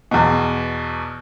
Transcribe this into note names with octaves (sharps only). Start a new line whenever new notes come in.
E2 B2